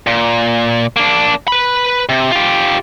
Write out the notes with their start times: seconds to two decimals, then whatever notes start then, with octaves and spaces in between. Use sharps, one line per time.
0.07 A#2
0.96 A#3 D4
1.48 B4 B5
2.09 C3
2.31 F4 G4